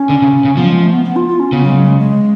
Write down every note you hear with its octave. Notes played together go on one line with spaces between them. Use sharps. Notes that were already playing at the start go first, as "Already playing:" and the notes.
Already playing: C#4
D3
C#3
C#3
F3 B3
F#3
G#3
A3
B3
B3
F4
F4
C#4
C#3 B3
F#3
G#3
F#3
G#3
G#3